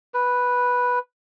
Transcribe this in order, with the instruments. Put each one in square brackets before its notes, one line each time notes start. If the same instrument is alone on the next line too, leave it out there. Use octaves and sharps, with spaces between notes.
[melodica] B4